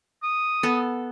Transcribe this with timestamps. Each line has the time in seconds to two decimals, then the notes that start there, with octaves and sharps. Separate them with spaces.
0.23 D#6
0.63 B3 A4